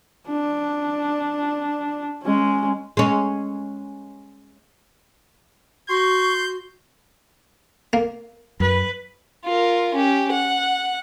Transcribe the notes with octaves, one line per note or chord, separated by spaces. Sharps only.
D4
G#3 C#4
G#3 C#4
F#4 C6 C#6 G6
A#3
F#2 B4
F4 A#4
C#4 G4
F#5